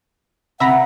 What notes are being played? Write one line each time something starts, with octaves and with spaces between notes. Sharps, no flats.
C3 E5 F#5 A#5 B5